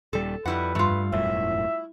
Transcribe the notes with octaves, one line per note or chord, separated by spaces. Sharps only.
D#1 G3 A4
F2 G3 E4 B4 F#5
G2 A3 F4
E1 F#2 A2 E4 E5